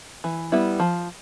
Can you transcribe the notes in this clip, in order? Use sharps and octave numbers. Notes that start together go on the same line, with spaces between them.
E3
G3 B3 E4
F3